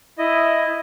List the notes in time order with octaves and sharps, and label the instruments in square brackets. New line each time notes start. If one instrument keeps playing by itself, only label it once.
[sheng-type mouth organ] E4 D#5